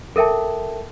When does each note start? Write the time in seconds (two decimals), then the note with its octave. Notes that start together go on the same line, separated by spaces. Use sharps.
0.16 A4 A#4 E5 G5 A5